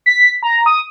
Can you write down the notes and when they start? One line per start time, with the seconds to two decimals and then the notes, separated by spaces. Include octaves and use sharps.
0.06 B6
0.43 A#5
0.66 D#6